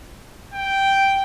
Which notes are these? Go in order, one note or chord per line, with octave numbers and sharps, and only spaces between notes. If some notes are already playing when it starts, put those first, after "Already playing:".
G5